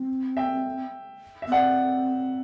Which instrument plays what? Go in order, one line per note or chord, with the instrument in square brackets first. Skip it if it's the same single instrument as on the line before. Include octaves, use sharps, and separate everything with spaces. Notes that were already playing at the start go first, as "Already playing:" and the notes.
Already playing: [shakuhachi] C4
[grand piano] E5 G5
E5
[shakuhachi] B3
[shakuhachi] C4 [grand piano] D5 F#5